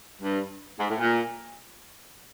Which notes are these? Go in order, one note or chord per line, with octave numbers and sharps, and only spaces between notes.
G2
G#2
A2
A#2